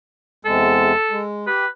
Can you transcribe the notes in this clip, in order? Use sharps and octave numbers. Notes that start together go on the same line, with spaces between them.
E2 C3 G#3 A4
G#3
G4 B4